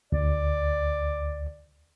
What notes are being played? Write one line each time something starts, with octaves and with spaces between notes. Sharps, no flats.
D2 D5